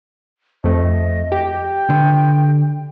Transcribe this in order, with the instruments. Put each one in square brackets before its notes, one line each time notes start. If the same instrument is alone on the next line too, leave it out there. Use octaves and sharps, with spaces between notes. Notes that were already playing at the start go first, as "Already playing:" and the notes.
[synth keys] F2 A3 [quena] D#5
[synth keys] G4
[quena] G5
[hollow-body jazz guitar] D3